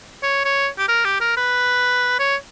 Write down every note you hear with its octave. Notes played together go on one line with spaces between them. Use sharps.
C#5
C#5
G4
A#4
G4
A#4
B4
C#5